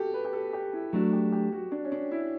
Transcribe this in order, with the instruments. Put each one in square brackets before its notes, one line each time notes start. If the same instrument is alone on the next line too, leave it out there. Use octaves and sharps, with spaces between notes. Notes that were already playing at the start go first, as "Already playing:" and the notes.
Already playing: [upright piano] F#4 G4 A4
B4
G4
A4
G4
E4
[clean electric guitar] F#3 A3 D4 [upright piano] F#4
[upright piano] G4
G4
F#4
D4
C#4
D4
E4